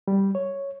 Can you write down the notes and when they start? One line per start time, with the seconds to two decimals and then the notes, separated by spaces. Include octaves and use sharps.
0.08 G3
0.35 C#5